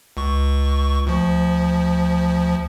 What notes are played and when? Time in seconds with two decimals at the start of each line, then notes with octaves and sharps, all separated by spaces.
0.17 C#2 C#6
1.07 D2 F3